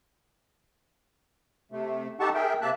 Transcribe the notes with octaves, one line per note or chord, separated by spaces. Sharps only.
C3 A3
D#4 G4 A4 F#5 A5 C#6
G#4 A#4 E5 G5
C3 A#3 E5 A5 F#6